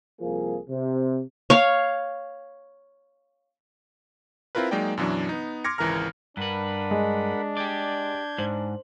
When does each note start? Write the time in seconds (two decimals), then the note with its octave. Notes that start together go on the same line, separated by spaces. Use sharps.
0.21 C2 F3 A#3 G#4
0.69 C3
1.50 C#5 F5
4.55 C4 E4 F4 A#4 B4
4.71 F#3 G#3 A#3 D#4 D5 G5
4.97 F#2 B2 E3 F#3 D4
5.29 B3 D#4
5.64 C6 D6 F6 G#6 A#6 C#7
5.78 G#1 C#2 E3 A#4 A#5 F6
6.37 G2 D4 A#4 B4 F#5 B5
6.91 G#3
7.57 G4 D5 G6 G#6
8.38 G#2 C5 F#7